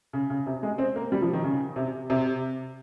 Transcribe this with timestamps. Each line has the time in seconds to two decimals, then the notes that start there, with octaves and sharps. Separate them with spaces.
0.13 C#3
0.30 C#3
0.46 C3
0.63 G#3
0.78 C4
0.96 A#3
1.12 G3
1.22 F3
1.33 D#3
1.44 C#3
1.76 C3
2.10 C3